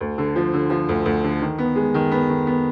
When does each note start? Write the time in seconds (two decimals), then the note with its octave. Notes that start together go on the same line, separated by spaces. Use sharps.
0.01 D2
0.18 D3
0.36 F3
0.53 D3
0.70 F3
0.89 D2
1.05 D2
1.24 D3
1.41 D#3
1.58 B3
1.76 G#3
1.94 D#3
2.12 B3
2.29 D#3
2.47 B3